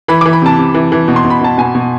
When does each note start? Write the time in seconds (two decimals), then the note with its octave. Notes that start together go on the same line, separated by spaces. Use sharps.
0.08 E3 B5
0.21 E3 D6
0.33 B5
0.42 C3 A5
0.58 C3
0.74 E3
0.92 E3
1.08 B2
1.16 C6
1.25 B2
1.30 B5
1.41 B2 A5
1.58 B2 G#5
1.75 B2